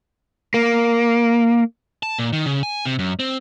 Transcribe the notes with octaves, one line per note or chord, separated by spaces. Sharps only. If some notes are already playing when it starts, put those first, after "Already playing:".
A#3
A5
A#2
D#3
C#3
G#5
C3
F#2
C4